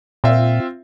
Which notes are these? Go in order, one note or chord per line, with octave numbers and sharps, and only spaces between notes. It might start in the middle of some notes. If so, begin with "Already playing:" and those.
A#2 C4 F4 E5